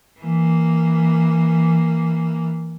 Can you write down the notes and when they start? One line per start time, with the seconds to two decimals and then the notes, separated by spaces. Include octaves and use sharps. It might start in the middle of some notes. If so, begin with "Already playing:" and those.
0.20 E3 A#3